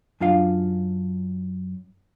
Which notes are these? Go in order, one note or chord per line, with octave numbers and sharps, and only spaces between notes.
F#2 D4 F4 F5